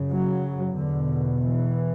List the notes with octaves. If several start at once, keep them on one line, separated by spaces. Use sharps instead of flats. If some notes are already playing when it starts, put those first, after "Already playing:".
Already playing: F#2 C#3
F#3
E2 B2 D3
E3